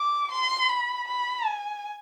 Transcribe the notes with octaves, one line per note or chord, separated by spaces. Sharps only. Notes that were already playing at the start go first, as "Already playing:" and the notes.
Already playing: D6
C6
B5
B5
G#5